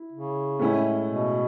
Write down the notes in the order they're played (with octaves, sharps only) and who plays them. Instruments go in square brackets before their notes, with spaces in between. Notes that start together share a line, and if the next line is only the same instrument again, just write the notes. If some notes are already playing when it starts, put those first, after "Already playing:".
Already playing: [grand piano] E4
[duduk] C#3
[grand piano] A2 G#3 C#4 E4
[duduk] B2